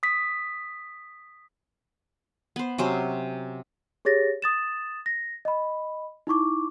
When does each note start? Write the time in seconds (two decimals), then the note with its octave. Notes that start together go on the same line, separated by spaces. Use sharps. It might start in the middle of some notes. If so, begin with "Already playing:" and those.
0.03 D#6 B6
2.56 B3 C5
2.78 C3 F#3 C#4 C5
4.05 G4 G#4 C#5 A6 A#6
4.42 D#6 A6 E7
5.06 A#6
5.45 D#5 B5
6.27 D#4 E4 C#6 D6